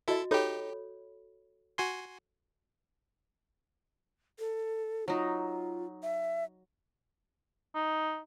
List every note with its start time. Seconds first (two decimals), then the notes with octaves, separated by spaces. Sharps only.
0.08 E4 F#4 A4 D#5
0.31 D#4 G4 A4 C#5 B5
1.78 F#4 G#5 C6
4.39 A4
5.08 F#3 D#4 F4
6.03 E5
7.75 D#4